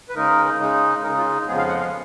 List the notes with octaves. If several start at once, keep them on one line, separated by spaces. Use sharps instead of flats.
B4
C#3 G#3 D#4 A#4
C#3 G#3 D#4
C#3 G#3 D#4 A#4
F4
F2 C#3 F3 G#3 B3 G#4
F5
F#5
F5